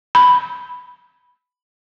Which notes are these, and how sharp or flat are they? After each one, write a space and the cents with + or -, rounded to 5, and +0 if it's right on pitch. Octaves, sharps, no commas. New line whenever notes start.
B5 +5